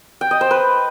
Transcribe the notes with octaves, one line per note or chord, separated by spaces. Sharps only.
G5
D#5
C5
B4